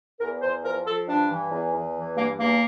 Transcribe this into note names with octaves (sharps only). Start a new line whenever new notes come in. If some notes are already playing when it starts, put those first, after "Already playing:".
E2 A#4
E2 C5
F3 A#4
F3 A4
G2 D4
E3
E2
E2
E3
G2 A#3
E2 A#3